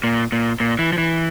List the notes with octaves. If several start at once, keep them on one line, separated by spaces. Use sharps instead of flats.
A#2
A#2
A#2
E3
F3
E3